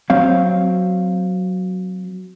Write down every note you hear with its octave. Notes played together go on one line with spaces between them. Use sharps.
F#3 C4 F5